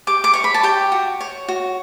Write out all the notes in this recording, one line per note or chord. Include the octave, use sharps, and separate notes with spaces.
G4 D6
D6
C#5 C#6
B5
A5
G4 G5
F#4
C#5
F#4